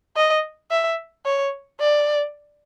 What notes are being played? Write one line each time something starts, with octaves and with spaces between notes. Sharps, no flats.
D#5
E5
C#5
D5